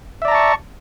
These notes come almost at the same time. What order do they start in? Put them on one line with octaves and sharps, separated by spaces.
E5 D5 A#5 A5 C#6